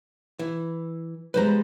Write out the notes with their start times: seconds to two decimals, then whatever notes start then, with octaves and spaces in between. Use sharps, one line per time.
0.39 E3
1.34 G3 G#3 B3 B4 C5 A#5